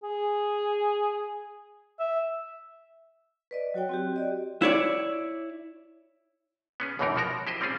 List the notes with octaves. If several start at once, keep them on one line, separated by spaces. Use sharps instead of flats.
G#4
E5
B4 D5 D#5
F#3 F#4 C#5 G5
C4 F#4 G4
G4 D5 D#5
E4 C#5 D5
B3 C#4 G#4
C#2 F#2 B2 E3 D#4 A#4
B2 F3 F#4 A#4 A#5
E4 G4 C5 D#5
G3 C4 C#4 F4 G#4